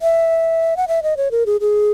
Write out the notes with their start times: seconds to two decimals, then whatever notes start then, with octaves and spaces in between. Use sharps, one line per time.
0.02 E5
0.77 F#5
0.88 E5
1.03 D#5
1.17 C#5
1.31 A#4
1.46 G#4
1.61 G#4